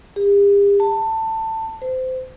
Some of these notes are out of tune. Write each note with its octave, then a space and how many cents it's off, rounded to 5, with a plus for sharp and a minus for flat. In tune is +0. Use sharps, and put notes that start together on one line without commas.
G4 +45
A5 +20
C5 -25